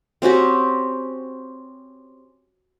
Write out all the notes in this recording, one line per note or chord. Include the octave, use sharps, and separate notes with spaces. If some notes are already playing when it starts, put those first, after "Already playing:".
C4 C#4 F#4 G4